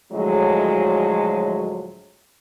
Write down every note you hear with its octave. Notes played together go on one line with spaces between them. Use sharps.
D2 A2 F3 F#3 G#3 D#5